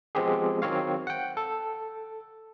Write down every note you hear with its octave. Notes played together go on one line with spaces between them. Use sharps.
F3 G#3 B3 C4 G4 G#4
D#3 F#3 C4 C#5 F5
F#5 G5
A4